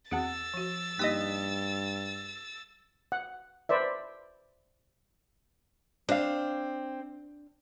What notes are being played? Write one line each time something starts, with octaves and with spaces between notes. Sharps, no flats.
E2 C4 F#4 G#4 F#5 E6 A6
F3 F#4
G2 A#3 D#4 G4 D#5 D#6 B6
F#5
B4 C5 D5 E5
C4 D4 F5